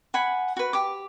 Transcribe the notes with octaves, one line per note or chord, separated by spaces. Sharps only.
F#5 G#5 B5
F#4 B4
G4 D6